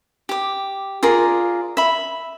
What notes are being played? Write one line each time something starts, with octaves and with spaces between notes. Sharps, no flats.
G4 D6
F4 G#4 A#4 D5
E5 B5